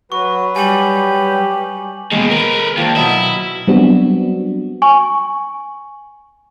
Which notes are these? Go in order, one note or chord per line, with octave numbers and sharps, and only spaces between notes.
F#3 F#4 B4 C#6
G3 G4 G#5 F#7
D#2 B2 G#3
A#4 B4
D#2 F3 D4
B2 F#3 E4 D#5
F#3 G3 B3 C4 D4 F#4
G#5 C#6